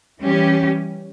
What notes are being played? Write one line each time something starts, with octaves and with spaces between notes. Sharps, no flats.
E3 G3 C#4 G4